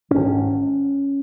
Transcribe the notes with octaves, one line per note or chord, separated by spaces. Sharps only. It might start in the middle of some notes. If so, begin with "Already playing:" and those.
G#1 G#2 C#4